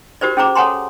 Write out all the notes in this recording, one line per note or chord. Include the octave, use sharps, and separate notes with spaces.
F#4 G4 A#4 C5 D5
C#4 G#4 C5 A#5 D6
A4 C#5 F#5 G#5 A#5 C6